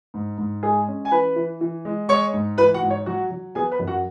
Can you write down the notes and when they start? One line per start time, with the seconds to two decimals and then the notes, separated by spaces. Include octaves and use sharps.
0.14 G#2
0.38 G#2
0.63 G#3 G#4 G#5
0.88 C#4
1.05 G#5
1.11 E3 B4 B5
1.36 E3
1.61 E3
1.85 G#3
2.08 G#3 C#5 C#6
2.33 G#2
2.58 E3 B4 B5
2.74 F#4 F#5
2.82 G#2
2.90 C#5
3.06 F#3 F#4 F#5
3.31 F#3
3.55 B3 G#4 G#5
3.71 B4 B5
3.79 F#2
3.87 F#4 F#5